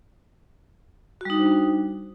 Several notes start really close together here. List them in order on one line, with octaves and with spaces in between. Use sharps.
F#4 G3 D#4 D4 C5